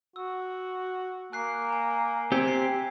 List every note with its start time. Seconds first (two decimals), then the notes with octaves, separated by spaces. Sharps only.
0.16 F#4 E6
1.32 A#3 G#5 F#6 C7
1.70 G#5 A#5
2.32 C4 G4 E6 G#6 B6
2.48 A#5 C7